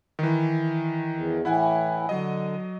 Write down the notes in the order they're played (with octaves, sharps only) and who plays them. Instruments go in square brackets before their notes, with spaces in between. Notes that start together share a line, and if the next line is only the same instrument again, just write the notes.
[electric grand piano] D#3 E3
[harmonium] E2
[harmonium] A2 E3 [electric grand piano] E4 F#5 G#5
[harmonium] D3 [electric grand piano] F#3 D#5